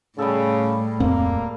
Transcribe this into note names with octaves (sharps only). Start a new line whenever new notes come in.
A2 C#3 G3 G#4 A4
D1 F2 A#3 C4